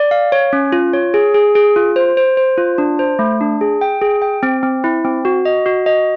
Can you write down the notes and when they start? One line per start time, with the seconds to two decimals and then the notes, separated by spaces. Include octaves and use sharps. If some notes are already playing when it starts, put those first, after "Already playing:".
Already playing: D5
0.11 F5
0.32 C#5
0.53 C#4
0.72 F4
0.93 C#5
1.14 G#4
1.34 G#4
1.55 G#4
1.76 F4
1.96 C5
2.17 C5
2.37 C5
2.58 F4
2.78 D4
2.99 C5
3.19 A3
3.41 D4
3.61 G#4
3.81 G5
4.01 G#4
4.22 G5
4.43 C4
4.63 C4
4.84 E4
5.05 C4
5.25 F#4
5.45 D#5
5.66 F#4
5.86 D#5